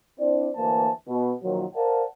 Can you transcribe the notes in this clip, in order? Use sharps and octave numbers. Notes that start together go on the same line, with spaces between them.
C4 D4 E4 C5 D5
D2 E3 A#3 B4 C5 A5
B2
A#2 D#3 F3 F#3
A#4 C5 D5 F5 F#5 A5